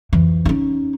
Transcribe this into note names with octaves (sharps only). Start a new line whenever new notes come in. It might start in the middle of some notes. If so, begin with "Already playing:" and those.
F2 E3
C#4 D#4